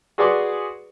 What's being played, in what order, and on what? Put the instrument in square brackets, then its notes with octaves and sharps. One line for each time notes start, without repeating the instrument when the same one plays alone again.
[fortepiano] F#4 G#4 B4 D5 C6 C#6